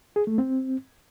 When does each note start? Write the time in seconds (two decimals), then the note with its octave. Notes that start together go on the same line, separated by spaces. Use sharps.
0.16 G#4
0.27 A3
0.38 C4